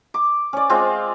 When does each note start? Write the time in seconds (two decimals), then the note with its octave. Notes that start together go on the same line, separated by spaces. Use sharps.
0.14 D6
0.53 C#4 D5
0.69 G#3 C4 F4